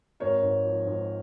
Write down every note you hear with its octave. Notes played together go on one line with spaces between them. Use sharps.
G#1 A#4 C#5
G#2
F3
G#2